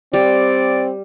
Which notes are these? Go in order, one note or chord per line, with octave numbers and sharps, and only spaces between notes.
G3 C4 D5